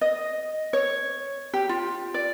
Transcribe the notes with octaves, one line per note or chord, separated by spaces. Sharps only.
D#5
C#5
G4
F4
D5